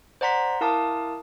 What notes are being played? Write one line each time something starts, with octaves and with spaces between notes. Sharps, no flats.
C5 D5 F#5 A#5 C6 B6
E4 A#4 F5 A5 D6 D#6